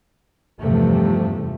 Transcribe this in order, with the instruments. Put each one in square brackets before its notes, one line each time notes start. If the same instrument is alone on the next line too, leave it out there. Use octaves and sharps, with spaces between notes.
[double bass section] E2 G2 C3 F3 A3